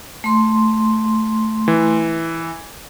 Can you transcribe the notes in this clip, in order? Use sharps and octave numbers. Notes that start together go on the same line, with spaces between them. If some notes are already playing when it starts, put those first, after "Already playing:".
A3 C6
E3